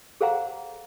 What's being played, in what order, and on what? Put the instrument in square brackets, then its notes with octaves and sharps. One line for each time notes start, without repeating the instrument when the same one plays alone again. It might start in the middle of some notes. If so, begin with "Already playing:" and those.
[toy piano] G#4 A4 C5 F5 F#5 A#5